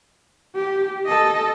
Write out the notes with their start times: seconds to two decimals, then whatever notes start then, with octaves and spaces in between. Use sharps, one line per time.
0.55 G4
1.06 A4 D#5